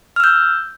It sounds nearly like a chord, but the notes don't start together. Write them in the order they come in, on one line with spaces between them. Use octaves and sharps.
F6 E6 G6